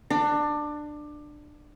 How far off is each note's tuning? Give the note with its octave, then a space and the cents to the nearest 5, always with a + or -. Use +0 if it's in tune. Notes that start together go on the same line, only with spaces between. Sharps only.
D4 +20